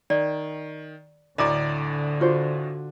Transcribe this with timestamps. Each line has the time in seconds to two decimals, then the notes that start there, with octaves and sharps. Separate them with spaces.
0.10 D#3 D5
1.38 D2 A2 D3 D5 D#5 A#5 D6
2.20 F4 F#4 C5